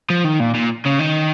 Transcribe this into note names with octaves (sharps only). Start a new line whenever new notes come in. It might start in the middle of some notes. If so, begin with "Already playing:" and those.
F3
D#3
A#2
A#2
C#3
D#3